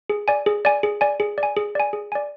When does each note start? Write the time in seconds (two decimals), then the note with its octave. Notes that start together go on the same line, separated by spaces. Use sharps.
0.10 G#4
0.28 D5 G#5
0.46 G#4
0.65 D5 G#5
0.83 G#4
1.01 D5 G#5
1.20 G#4
1.38 D5
1.43 G#5
1.57 G#4
1.75 D5 G#5
1.93 G#4
2.12 D5 G#5